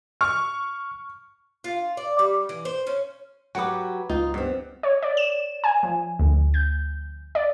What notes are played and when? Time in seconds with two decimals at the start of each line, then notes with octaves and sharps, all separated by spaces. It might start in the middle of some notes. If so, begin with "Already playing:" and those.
0.21 C#6 F6
1.64 F4
1.97 D5
2.19 G3
2.49 E3
2.65 C5
2.87 C#4
3.55 F#3 F#4 G4 B4 F#5 D6
4.10 C#2 D#4 F4
4.34 G2 B3 C4
4.83 C#5
5.02 D5
5.17 E7
5.64 G#5
5.83 F3
6.19 D2
6.54 G6
7.35 D5